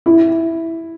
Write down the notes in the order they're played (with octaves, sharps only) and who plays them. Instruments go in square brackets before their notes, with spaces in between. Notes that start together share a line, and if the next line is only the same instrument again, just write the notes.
[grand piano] E4